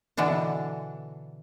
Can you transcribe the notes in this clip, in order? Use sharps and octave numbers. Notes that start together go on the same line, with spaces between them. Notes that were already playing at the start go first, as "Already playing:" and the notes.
B2 D3 E3 D4